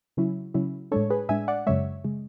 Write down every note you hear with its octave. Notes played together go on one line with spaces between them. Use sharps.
C#3 F#3 C#4 E4
C#3 F#3 C#4 E4
A2 G#3 D4 A4 C#5
G#4 B4
A2 G#3 D4 E5 G#5
D5 F#5
F#2 C#3 G#3 C#5 E5
C#3 G#3